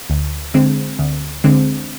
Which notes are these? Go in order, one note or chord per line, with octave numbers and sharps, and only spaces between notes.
D2
D3 G#3 C4
D2
D3 G#3 C4